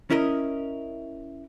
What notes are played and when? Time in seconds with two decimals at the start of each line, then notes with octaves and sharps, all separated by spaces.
0.10 C#4 E4 A#4 D#5